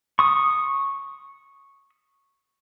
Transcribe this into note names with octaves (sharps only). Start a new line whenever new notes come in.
C#6 D#6